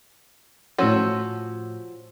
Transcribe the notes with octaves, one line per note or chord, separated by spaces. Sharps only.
A2 F3 C#4 F#4 E6 G6